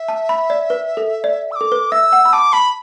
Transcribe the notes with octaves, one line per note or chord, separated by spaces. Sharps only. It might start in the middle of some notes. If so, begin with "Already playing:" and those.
Already playing: E5
A5
B5
D5
B4
A4
D5
E6
D6
A4
B4
E5 E6
F#5
B5
A5 D6
A5 B5